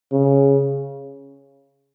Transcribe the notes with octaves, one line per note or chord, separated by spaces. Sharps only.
C#3